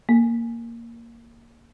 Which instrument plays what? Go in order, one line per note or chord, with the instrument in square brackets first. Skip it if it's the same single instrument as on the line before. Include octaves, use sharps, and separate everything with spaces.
[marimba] A#3